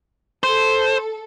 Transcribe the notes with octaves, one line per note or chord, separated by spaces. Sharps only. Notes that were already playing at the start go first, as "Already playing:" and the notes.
A4 C5